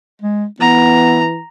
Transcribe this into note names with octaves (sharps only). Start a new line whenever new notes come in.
G#3
E3 B3 A#5